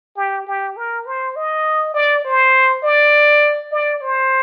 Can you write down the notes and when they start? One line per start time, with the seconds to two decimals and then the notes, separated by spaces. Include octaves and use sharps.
0.17 G4
0.47 G4
0.77 A#4
1.06 C5
1.36 D#5
1.94 D5
2.24 C5
2.83 D5
3.72 D5
4.01 C5